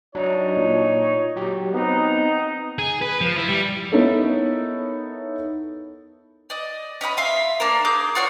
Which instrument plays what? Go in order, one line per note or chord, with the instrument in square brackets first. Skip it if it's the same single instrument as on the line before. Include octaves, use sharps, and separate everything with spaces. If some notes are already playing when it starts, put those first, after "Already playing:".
[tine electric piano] F#3 D4 [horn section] D#4 C#5
[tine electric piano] A#2
F#3 G4
[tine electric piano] B3 C4 B4 [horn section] D#4
[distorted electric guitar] G#4
B4
F3
E4
G3
[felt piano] B3 D#4 E4 A4 A#4 C#5
[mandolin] D5 D#5
C#4 D#5 F#5 B5
E5 F5 C6
A#3 D4 A#4
G#4 D6 G6
F4 F#4 C#5 D5